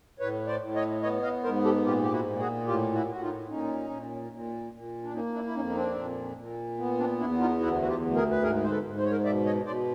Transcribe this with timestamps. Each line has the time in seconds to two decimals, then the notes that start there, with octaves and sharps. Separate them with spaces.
0.20 A2 B4 C#5
0.47 C5 D5
0.61 A2
0.75 C#5 D#5
1.02 B3 C#5 D#5
1.23 D#5 F5
1.43 G#2 A#4 C5
1.64 G4 A4
1.84 A#2 F4 G4
2.02 G4
2.12 E4 F#4
2.25 A#2
2.40 F#4 G#4
2.67 A2 F4 G4
2.94 E4 F#4
3.09 A2 F#4
3.21 D#4 F4
3.49 A#2 C#4 D#4
3.90 A#2
4.32 A#2
4.73 A#2
5.03 D4
5.13 A#3 C#4 D#4
5.34 D4 E4
5.46 E4
5.54 F2 C#4 D#4
5.69 D#4
5.75 C4 D4
5.95 A#2
6.37 A#2
6.78 B3
6.99 C4 D4
7.19 E2 D4 E4
7.40 D#4 F4
7.60 D2 E4 F#4
7.82 F#4
7.87 F4 G4
8.01 D2
8.15 G#4 A#4
8.31 B4
8.42 G#2 G#4 A#4
8.64 C5
8.70 A4 B4
8.84 G#2
8.97 C5
9.05 C#5
9.11 A#4 C5
9.25 B2 D5 E5
9.45 C#5 D#5
9.65 B2 C5 D5